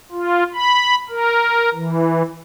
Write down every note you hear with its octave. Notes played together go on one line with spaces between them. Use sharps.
F4
B5
A#4
E3